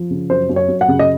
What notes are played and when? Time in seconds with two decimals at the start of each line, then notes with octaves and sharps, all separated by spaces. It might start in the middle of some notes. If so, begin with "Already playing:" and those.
Already playing: F3
0.10 C#3
0.30 F#2 C5
0.49 F#2
0.56 C#5
0.68 F#2
0.81 F#5
0.88 C#3
0.99 D#5